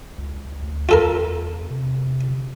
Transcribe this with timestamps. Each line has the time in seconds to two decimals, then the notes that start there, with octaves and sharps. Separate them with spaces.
0.18 C#2
0.62 D2
0.89 E2 F4 A4 A#4
1.70 C3